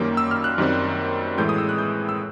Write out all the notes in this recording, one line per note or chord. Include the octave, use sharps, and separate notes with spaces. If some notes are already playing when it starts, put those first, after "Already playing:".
Already playing: F#2 D#3 G3 A#3 C#4 D6
E6
F6
F#6
F#2 D#3 G3 C4
A2 E3 G#3 G6
D#6
E6
F#6
G6
E6